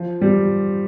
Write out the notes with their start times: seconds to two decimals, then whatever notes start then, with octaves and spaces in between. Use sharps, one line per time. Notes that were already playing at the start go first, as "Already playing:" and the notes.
Already playing: F3
0.21 G3